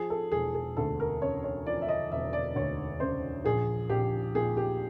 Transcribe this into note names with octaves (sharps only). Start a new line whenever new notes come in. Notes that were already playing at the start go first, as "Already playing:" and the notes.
Already playing: F3 G#4
A4
E1 G#4
G#4
D2 A4
A#4
C#3 C#5
C#5
F3 D5
E5
D#5
E1 E5
D5
D2 C#5
C#3 C5
A#1 G#4
A#1 G4
A#2 G#4
G4